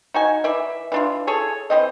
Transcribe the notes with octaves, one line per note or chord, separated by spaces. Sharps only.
D#4 F#4 G#5
E3 D5 E5
E3 D4 F4
G#4 A4 C#5
E3 C4 D#5